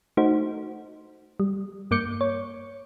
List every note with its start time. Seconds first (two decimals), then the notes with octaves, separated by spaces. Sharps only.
0.17 A3 D#4 F#4 C5
1.40 G3
1.91 G2 A#3 D6 G6 C#7
2.21 C#5